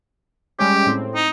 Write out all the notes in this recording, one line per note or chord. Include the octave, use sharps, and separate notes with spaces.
G3 G#3 C#4 G4
A2 C4
D#4